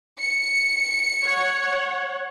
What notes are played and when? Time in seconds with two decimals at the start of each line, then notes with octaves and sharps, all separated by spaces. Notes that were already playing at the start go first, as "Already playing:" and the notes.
0.19 C#7
1.22 C#5 F#5